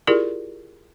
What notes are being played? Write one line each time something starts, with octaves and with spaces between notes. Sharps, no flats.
E4 F4 G4 G#4 A#4 D5